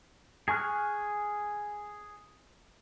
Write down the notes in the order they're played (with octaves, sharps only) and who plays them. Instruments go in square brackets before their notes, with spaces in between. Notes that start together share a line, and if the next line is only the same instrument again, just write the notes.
[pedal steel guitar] G#4 G#5 C#6 F6 F#6